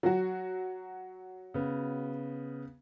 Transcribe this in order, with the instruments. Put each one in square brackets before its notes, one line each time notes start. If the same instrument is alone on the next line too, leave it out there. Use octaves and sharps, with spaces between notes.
[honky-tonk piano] F#3 F#4
[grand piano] C#3 B3